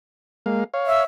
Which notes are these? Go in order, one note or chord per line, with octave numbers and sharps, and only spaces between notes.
G#3 A#3 F5
C#5 F5
E5